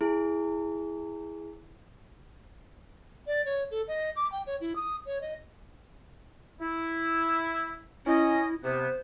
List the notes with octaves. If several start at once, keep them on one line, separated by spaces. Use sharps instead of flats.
E4 G#4
D5
C#5
A4
D#5
D6
G5
C#5
E4
D#6
C#5
D#5
E4
C#4 E4 D#5
C3 B3 C5